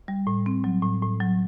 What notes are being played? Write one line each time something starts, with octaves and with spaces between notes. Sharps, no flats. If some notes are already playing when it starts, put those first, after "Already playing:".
G3
A2
C4
F#3
A2
A2
F#3